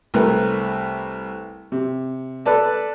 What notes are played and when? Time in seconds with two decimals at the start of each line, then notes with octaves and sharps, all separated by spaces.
0.14 C2 A3 A#4 B4
1.72 C3
2.46 A4 B4 D5 A5